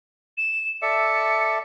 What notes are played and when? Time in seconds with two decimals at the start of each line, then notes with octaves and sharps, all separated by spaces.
0.37 E7
0.82 A4 D5 E5 C#7